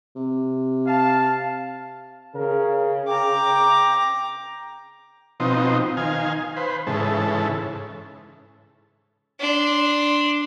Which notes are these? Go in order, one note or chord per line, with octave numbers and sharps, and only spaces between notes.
C3
F5 A5
C#3 A#4
G5 A#5 D6
B2 F3 C4 D#4
D#3 F5 G#5
B4 C5
G#2 C#3 E3 A4
D4 C6